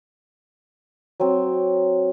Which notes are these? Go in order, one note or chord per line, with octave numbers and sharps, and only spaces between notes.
F#3 C4